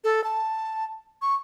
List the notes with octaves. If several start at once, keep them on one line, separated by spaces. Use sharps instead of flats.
A4
A5
C#6